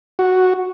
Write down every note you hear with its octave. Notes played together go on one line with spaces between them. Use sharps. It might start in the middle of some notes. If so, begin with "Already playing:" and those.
F#4